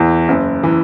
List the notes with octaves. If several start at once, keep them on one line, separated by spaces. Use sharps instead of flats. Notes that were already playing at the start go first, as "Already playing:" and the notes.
Already playing: E2 E3
F#1
E3